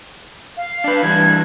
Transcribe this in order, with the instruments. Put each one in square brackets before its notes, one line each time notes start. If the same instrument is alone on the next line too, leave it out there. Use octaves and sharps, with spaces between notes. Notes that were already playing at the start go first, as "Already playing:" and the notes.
[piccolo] F5
[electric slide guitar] D4 B4
[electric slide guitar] E3 G3 D4 [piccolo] G#6